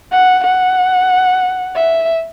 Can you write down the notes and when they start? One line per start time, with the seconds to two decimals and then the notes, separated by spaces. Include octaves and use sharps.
0.11 F#5
0.44 F#5
1.76 E5